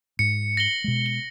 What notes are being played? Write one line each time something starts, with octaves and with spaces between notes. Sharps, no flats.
G#2 C#7
A#6 F#7 G7
B2 G#3
G7